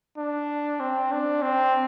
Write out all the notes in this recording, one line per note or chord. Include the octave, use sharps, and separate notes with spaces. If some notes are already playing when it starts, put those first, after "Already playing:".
D4
C4
D4
C4